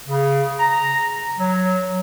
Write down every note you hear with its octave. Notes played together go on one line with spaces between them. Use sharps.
C#3
A#5
F#3